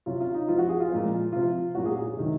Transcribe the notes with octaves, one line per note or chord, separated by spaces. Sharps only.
C3 F#3 C#4 F4
F4
D#4
F3 C4 F4
F#4
G#4
F4
A#2 F3 G#3 C4
C3 F3 C4 F4
A#2 F#3 C#4 F#4
G#4
G#4
G#4
C3 D#3 F#3 D#5